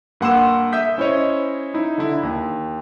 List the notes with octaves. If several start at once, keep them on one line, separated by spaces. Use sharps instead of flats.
G2 A#3 F#5 C6 E6 E7
E5 D#6 E6 G6 B6
C#4 E4 C5 C#5 D#5
D#4 E4
D3 E4
D#2